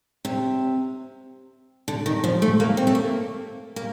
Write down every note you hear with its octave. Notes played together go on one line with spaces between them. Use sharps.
C3
D3
D#3
F3
A3
A#3
C4
A3
A#3
A#3